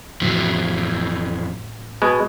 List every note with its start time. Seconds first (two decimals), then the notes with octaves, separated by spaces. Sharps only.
0.21 F2 A2 C#3 E3 F#3
2.02 B2 G#3